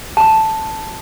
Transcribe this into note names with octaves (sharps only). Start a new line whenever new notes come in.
A5